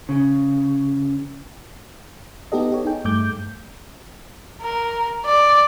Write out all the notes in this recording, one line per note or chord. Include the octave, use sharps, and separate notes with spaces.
C#3
B3 D#4 G4 A4 D#5
G4 C#5
D#4 G#4 G5
G2 A3 D6 G6
A#4
D5